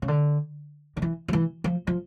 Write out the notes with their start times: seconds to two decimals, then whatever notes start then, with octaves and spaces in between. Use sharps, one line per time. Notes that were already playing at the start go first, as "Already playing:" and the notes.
0.02 C#3
0.08 D3
0.97 D3
1.02 E3
1.28 F3
1.33 E3
1.64 F3
1.87 F3